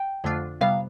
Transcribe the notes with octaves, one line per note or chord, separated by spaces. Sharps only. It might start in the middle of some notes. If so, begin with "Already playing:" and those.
Already playing: G5
F2 D3 A3 D4 F4
C3 G3 B3 F5